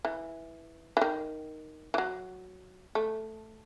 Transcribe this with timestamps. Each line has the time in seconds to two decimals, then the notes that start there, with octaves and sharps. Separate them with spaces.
0.05 E3
0.97 E3
1.01 D#3
1.94 E3
1.98 F#3
2.95 A3